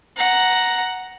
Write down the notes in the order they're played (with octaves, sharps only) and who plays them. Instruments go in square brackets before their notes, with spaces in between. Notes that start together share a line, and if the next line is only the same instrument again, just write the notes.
[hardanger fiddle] F#5 A#5